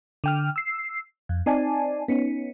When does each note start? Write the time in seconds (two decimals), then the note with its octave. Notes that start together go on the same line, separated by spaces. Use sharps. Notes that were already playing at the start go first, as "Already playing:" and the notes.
0.24 D3 G5 F6
0.56 E6 C7
1.29 F2
1.46 C4 D#4 D5 G#5 A5
2.08 B3 C#4 D#4